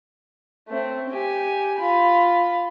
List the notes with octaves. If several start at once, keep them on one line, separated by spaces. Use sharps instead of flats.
A3 C4
G4 G#5
F4 B5